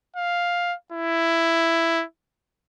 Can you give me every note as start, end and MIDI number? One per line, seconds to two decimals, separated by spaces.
0.16 0.74 77
0.92 2.04 64